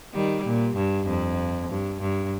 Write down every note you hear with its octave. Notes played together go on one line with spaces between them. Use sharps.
D#3 G3
A#2
G2
F2
G2
G2